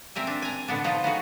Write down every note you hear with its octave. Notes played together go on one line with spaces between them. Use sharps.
C4 A#4 E5 G#5
D4
G#5 A#5
B2 D3 B3 D4
F3 D#4 F4
B3 D#4 F#4 G#4